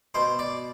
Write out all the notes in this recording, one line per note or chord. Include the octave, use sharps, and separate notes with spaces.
B2 C5
D5